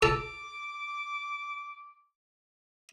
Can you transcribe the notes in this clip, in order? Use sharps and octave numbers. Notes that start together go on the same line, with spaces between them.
A4 D6